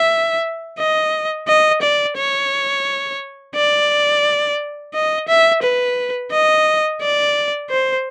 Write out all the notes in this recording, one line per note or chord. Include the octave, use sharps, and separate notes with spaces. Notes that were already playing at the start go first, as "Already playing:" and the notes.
Already playing: E5
D#5
D#5
D5
C#5
D5
D#5
E5
B4
D#5
D5
C5